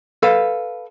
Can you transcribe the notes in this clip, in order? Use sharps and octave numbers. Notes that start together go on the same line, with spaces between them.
A4 B4 F5